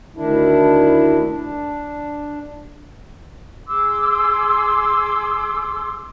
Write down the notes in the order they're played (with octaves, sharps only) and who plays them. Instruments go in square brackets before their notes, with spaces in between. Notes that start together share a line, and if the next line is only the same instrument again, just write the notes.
[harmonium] D2 D#3 D4 E4
D4
[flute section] G#4 C6 D6 E6